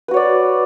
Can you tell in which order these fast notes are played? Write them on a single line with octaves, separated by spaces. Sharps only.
B4 F#4 C#5 D5